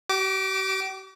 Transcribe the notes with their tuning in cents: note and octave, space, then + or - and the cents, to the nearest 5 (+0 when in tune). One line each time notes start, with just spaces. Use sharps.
G4 -45 D6 +0